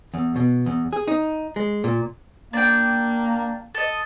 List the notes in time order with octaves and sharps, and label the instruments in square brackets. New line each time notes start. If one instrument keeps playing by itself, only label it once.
[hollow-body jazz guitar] E2
B2
E2
G#4
D#4
G#3
A#2
[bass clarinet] A#3 [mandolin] D4 G5
[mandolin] A4 D#5